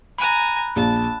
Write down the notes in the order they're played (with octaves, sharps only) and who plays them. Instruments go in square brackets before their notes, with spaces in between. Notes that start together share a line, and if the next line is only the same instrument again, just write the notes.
[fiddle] G#5 A#5 [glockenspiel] B5 F#6
[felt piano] A#1 [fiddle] A5